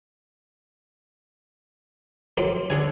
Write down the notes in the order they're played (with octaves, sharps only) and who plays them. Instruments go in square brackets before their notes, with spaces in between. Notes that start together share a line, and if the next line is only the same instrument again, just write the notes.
[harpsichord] F2 F#3 C4
[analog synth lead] D3 [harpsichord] C#4 G#4 G#5